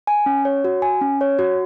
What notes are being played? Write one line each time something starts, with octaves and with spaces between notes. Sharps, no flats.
G#5
C#4
C#5
F#4
G#5
C#4
C#5
F#4